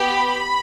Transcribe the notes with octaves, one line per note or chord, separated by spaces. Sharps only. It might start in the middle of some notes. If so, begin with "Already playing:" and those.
Already playing: B3 G4 B5